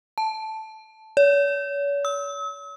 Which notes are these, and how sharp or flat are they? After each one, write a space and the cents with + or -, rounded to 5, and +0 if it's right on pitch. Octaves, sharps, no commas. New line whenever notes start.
A5 -5
C#5 +40
E6 -40